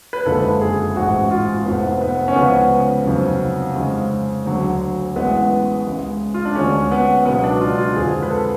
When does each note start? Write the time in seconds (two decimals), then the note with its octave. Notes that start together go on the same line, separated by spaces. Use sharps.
0.13 B4
0.26 F#1 F2 D3 F3 G#3 A4
0.61 G#4
0.96 A1 G#2 G#3 F#4
1.31 F4
1.65 F1 F2 F3 B3
2.01 B3
2.28 C#4
2.36 C#2 C#3 F3 B3
3.05 F1 F2 C#3 F#3
3.76 F2 C#3 G#3
4.45 D2 D3 F#3
5.16 A1 A2 G#3 B3
5.86 C#2 C#3 G#3
6.34 F4
6.45 D4
6.55 D2 D3 G#3 C#4
6.91 B3
7.25 C#2 B2 F#3 B3
7.44 D4
7.61 F4
7.78 F4
7.96 F2 D3 G#3 G#4
8.23 B4
8.31 A4